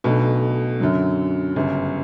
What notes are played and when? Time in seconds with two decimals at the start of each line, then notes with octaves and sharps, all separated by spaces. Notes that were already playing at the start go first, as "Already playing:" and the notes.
0.04 B1 B2 A3 D4
0.80 F#2 D3 F#3
1.55 G1 F#2 C#3